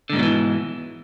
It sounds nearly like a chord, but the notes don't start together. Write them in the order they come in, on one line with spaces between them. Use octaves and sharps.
D3 G#2 B2 F#3 E3